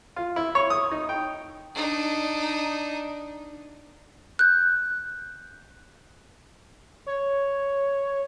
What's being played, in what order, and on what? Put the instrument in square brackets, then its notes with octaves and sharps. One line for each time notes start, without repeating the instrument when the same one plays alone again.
[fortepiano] F4
E4
C#5
D#6
D#4
G5
[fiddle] D4 D#4
[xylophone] F#6 G6
[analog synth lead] C#5